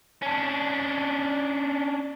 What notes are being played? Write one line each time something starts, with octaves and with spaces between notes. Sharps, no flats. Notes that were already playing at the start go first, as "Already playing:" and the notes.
C#4 D4